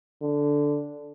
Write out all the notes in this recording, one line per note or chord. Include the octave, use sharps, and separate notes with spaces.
D3